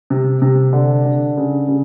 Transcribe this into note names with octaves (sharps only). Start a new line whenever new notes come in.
C3
C3
D3
D3
C#3
C#3